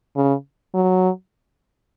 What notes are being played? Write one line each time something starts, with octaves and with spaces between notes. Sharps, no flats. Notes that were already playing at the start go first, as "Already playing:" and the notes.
C#3
F#3